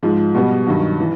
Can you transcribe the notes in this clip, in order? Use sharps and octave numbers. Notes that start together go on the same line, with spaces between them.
G#2 F3 G#3
B2 G3 B3
G2 D#3 F#3
E3